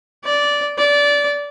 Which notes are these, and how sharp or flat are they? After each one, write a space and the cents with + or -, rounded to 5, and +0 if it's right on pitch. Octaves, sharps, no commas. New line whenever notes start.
D5 -10
D5 -20